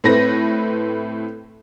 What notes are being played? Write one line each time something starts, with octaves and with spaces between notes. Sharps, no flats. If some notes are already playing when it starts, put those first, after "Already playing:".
A2 A3 C4 B4 A#6